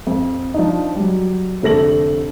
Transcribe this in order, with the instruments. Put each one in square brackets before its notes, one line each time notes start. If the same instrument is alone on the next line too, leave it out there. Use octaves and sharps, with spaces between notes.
[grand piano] F2
F3 D4 D#4
F#3 G3
F1 D3 A3 A#6 F#7